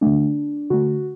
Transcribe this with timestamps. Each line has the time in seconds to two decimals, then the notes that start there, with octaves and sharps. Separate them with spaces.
0.01 D3 A3 D4
0.70 D3 A3 F#4